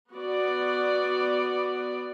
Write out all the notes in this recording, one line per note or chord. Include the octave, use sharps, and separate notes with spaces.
B3 F#4 D5